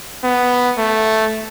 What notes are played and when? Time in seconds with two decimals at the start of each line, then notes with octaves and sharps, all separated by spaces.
0.24 B3
0.78 A3